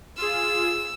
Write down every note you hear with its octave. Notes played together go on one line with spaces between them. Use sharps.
F4 G#4 E6